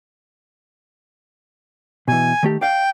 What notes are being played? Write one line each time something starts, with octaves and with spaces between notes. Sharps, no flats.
B2 E3 G#5
D#3 A3 G4
D5 F5 G5